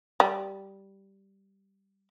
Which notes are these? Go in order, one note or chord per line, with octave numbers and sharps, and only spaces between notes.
G3